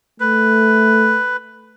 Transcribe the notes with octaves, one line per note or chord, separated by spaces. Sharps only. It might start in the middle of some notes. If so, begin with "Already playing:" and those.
A3 B4